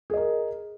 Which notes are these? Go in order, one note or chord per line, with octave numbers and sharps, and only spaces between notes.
G#4 A#4 D#5